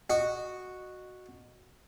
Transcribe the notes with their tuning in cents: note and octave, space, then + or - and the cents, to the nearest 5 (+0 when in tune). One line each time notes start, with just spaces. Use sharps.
F#4 -5 D#5 -20